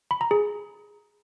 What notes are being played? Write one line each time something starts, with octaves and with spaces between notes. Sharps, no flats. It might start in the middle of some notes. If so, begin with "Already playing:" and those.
B5
A#5
G#4